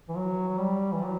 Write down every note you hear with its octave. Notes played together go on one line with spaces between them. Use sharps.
E3
F#3
F#3
G3
E3
F#3